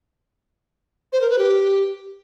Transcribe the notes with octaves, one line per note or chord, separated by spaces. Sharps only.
C5
A#4
B4
G4